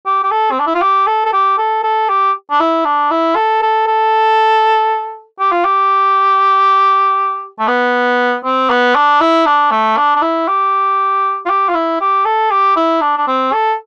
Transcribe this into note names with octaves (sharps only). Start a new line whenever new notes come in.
G4
G4
A4
C4
D4
E4
F4
G4
A4
A4
G4
A4
A4
G4
D4
E4
D4
E4
A4
A4
A4
G4
F4
G4
A3
B3
C4
B3
D4
E4
D4
A3
D4
D4
E4
G4
F4
G4
F4
E4
G4
A4
G4
E4
D4
D4
C4
A4